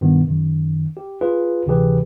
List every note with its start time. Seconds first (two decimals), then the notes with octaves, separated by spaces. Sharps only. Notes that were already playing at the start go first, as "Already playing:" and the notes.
0.01 G2 B2 D#3 B3
0.28 F#2 D#3
0.97 G4
1.21 F4 G#4 B4
1.66 D2 C3 E3 G4 G#4 B4